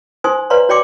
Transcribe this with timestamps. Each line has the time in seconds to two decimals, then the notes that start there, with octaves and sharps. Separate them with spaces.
0.24 D#4 C5 G#5 C6 D#6
0.50 B4 C#5 D5 F5 A#5 C6
0.69 F#4 C#5 D5 G5 C6 D6